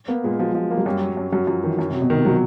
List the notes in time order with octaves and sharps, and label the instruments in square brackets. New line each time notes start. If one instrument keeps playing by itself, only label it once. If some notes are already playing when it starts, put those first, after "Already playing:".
[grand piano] A#3 [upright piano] B3
[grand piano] A#2 [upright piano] G#3
[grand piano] F3 [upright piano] F#3
[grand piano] F3
A#3
[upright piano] F#3
[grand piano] F#2 [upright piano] G3
[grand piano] F#3
[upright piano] G3
[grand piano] F#2
[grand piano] F#2 [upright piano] F#3
[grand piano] F#2 [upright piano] F3
[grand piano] D#3 [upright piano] E3
[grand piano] F#2
[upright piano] C3
[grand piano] F#3
[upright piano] B2
[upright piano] C3 [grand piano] D#3
[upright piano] F3
F#3